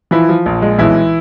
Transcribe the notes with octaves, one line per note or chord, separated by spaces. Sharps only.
E3 F3 E4
F3
A#1
G#3
B1 E3 E4